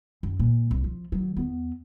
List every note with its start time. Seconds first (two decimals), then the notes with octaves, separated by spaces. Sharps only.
0.23 F#2
0.39 A#2
0.71 C2
0.84 F3
1.12 D#3 F#3
1.37 E2 B3